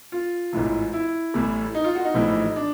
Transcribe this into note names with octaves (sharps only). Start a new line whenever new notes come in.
F4
A1 G#2 E3
E4
A1 A2 E3 G3
D#4
F4
F#4
D#4
A#1 A2 E3 G3
D4